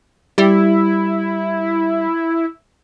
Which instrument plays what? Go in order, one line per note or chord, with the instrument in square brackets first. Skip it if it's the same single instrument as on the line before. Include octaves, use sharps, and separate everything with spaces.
[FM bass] G3 [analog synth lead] E4